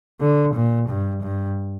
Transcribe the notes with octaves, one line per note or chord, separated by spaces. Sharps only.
D3
A#2
G2
G2